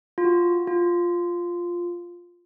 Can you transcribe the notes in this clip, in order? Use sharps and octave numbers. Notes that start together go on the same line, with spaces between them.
F4
F#4
F4